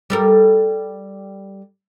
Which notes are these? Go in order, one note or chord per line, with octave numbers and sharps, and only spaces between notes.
G3 A4 A#4